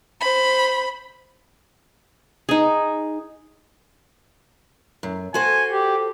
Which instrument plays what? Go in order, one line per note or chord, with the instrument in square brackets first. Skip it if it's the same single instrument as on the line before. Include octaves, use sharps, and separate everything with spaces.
[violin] C5 B5
[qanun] D#4 G#4
[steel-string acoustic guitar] F#2
[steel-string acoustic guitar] F#4 A4 C5 [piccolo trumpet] G#5
[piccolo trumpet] G4